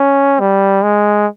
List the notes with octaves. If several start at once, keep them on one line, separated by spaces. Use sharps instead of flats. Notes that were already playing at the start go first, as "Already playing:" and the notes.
Already playing: C#4
G3
G#3